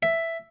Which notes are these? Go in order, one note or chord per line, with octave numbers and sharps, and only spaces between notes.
E5